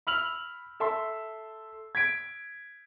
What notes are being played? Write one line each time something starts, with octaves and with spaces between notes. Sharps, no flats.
B5 E6 F6 F7 F#7
A4 E5 A5 C6 E6
G#6 B6 D7